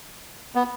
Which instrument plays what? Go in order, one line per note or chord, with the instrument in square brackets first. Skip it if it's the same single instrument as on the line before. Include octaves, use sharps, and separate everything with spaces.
[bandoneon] B3